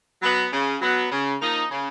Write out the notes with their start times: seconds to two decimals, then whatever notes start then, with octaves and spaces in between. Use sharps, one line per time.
0.22 F#3 B3
0.52 C#3
0.82 F#3 B3
1.12 C#3
1.41 F3 A#3 D#4
1.71 C#3